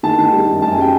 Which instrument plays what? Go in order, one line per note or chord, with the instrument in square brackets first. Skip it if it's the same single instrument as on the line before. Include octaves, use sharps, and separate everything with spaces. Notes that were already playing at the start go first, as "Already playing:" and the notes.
[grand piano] D#3 A5
D#3
G3
F#2
F#2 A5
G#5
G3 G5